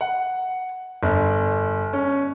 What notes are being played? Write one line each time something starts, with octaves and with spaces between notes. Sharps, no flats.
F#5
G1
C#4